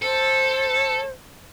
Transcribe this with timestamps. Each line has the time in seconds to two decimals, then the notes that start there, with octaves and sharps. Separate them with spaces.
0.02 A4 C5